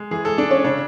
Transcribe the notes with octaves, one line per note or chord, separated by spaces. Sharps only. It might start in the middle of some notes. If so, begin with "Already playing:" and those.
Already playing: G#3
E3 G#4
A4
G#3
D4
G#3 C#4
C#3 D4